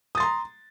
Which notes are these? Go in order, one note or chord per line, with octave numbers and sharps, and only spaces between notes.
A#5 C6 D#6 A6